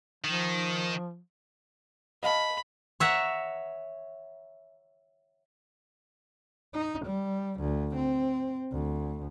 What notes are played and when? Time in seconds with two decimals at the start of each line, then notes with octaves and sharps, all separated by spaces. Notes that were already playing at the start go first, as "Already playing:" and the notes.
0.24 D#3 F3
2.23 D#5 F5 A5 B5
3.00 C#5 E5 F#5 A#5
6.75 D#4
7.06 G3
7.61 D2
7.96 C4
8.72 D2